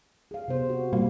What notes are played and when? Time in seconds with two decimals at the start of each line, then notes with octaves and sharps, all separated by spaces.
0.31 G#4 F5
0.48 C3 B3 C5
0.69 F#4
0.93 A#2 G3 A#3